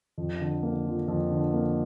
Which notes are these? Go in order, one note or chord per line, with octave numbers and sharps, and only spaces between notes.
F2
D3
A#3
F3
F2
D3
A#3